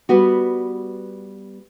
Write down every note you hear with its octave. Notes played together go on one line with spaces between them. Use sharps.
G3 B3 F#4